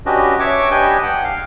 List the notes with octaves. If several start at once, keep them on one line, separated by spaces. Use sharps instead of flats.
C#4 D4 F#4 G4 B4 D#5
C#5 E5 C#6 D6
D4 G4 B4 D#5 G5 G#5
F#5 G5
F5